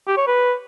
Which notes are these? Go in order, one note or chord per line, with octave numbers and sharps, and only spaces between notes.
G4
C#5
B4